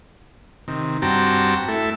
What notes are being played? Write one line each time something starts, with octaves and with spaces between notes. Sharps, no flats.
C3 D#3
G2 C4 F#4 G5 A5 A#5
A3 E4 A4